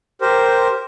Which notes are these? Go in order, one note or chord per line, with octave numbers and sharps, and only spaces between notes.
G4 A#4 C5